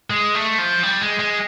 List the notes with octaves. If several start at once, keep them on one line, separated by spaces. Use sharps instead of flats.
G#3
A3
F3
G3
G#3
G#3